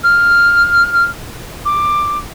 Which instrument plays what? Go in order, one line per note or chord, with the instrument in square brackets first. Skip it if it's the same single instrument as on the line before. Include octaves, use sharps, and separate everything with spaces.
[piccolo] F6
D6